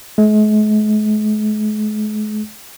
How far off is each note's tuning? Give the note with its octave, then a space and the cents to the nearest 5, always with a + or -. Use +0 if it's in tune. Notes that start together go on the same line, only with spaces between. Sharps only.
G#3 +45